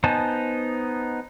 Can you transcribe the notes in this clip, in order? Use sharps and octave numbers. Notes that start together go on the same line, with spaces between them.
B3 D#4 C5 G#5 A5